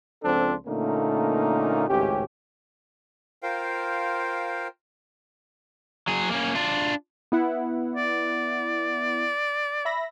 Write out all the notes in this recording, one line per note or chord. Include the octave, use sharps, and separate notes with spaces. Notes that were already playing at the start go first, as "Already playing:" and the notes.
C#2 F3 C4 D4 A4 C5
A#2 D3 A3 A#3 C#4 D#4
G#1 C#2 A2 C#4 G4
F4 A#4 C5 F5 G5
F#3 G#4
A#3 C#4
D4 F4
B3 E4 F#5
D5
E5 B5 A#6